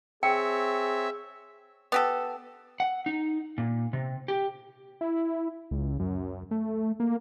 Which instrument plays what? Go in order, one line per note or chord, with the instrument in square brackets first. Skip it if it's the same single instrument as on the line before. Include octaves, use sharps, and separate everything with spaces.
[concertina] C4 C#5 [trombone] G#4 [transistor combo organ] E5 [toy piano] G5
[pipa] B3 G4 A4
[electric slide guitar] F#5
D#4
A#2
C3
G4
[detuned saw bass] E4
C#2
F#2
A3
A#3